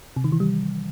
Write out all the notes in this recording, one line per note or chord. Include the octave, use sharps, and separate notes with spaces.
C3
D#3
E3
G3